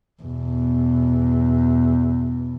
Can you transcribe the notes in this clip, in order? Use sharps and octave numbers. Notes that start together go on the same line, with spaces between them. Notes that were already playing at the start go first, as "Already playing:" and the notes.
E2 B2